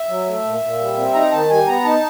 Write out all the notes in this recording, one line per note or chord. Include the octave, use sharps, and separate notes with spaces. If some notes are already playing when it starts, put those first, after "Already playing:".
Already playing: E5
F#3
A3
A#2
A#2
G3
C4
D#4 A#5
D#3 A5
G3 G#5
B3 A#5
D#4 A5